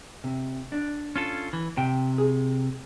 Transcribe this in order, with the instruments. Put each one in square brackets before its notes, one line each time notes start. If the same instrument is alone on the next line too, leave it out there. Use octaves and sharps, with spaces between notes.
[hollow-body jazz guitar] C3
D4
[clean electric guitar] C#4 F4 A4
E3
[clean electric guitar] C3 [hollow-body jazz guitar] G5
[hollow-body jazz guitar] G#4